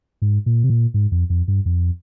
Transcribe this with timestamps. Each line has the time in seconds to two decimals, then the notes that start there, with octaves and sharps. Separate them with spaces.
0.22 G#2
0.46 A#2
0.63 C3
0.70 A#2
0.94 G#2
1.12 F2
1.30 F2
1.48 G2
1.66 F2